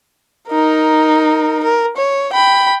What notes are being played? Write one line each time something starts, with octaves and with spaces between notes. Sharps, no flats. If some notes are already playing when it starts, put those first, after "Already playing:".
D#4 A#4
A#4
C#5
G5 B5